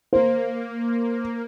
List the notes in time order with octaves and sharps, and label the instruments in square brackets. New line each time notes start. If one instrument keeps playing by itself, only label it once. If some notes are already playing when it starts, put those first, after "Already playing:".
[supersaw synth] A#3 [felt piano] C5